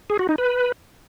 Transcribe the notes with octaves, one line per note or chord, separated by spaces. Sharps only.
G#4
F#4
D#4
B4